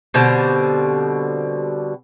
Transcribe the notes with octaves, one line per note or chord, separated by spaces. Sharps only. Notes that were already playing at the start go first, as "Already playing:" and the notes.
B2 D3 G3 C4